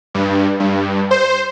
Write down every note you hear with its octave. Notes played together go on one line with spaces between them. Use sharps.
G2
G2
C5